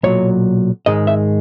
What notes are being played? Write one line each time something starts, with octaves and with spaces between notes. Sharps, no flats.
B1 A#2 F#3 C#5
G#2 D#3 G#3 D#5
E5